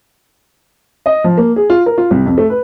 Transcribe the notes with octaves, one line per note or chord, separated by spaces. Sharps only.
D#5
F3
A#3
G#4
F4
A#4
F4
C2
F2
A3
B4